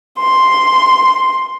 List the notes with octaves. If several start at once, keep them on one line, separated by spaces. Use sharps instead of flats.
C6